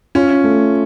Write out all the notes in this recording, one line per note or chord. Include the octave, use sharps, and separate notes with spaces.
C#4 F4
A3